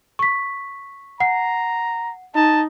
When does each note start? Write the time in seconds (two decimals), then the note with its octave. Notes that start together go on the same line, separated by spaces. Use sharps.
0.19 C#6 B6
1.20 F#5 A#5 C7
2.35 D#4 A5